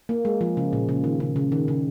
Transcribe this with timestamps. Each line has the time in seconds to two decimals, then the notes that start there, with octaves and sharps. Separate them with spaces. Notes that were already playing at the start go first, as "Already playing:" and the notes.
0.09 A#3
0.25 G#3
0.41 F3
0.57 C#3
0.73 A#2
0.89 C#3
1.04 D#3
1.20 C#3
1.36 C#3
1.52 D#3
1.68 C#3